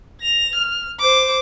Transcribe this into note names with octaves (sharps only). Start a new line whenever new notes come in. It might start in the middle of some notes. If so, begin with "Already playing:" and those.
A#6 F7
F6
C5 D6